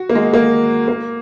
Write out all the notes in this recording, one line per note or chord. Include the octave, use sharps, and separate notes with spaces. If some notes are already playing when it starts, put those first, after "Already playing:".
Already playing: F#4
A#3
G#3
A#3
A#3